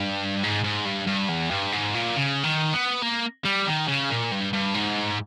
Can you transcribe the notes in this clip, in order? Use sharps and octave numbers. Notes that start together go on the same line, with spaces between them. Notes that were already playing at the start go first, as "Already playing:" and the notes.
Already playing: G2
G#2
G#2
G2
G2
E2
G2
G#2
A#2
C#3
D#3
B3
A#3
G3
D#3
C#3
A#2
G2
G2
G#2